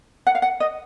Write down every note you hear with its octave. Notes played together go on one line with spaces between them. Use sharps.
F#5
F5
F#5
D#5